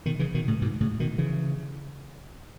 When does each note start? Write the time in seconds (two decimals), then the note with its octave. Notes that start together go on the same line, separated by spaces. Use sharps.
0.06 B2 D#3
0.19 C#3 E3
0.34 B2 D#3
0.48 A2 C#3
0.62 G#2 B2
0.81 A2 C#3
1.00 B2 D#3
1.18 C#3 E3